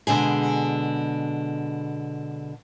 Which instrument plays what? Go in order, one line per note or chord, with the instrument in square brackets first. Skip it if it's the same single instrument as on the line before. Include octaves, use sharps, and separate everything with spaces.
[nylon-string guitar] B2 D3 G#3 G#4